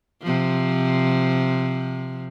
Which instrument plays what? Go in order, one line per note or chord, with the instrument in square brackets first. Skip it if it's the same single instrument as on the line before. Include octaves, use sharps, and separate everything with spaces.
[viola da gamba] C3 F3